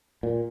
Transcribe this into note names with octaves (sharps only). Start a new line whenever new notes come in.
A#2